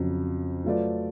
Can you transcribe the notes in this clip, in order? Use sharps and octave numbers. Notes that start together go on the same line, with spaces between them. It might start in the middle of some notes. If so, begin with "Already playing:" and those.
Already playing: F2 C#3 F#3
F#3 A3 F4 B4 D5